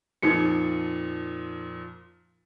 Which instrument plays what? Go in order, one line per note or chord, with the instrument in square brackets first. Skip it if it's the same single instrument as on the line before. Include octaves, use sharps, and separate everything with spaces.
[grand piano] F2 A#2 F3 [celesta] D#4 C#7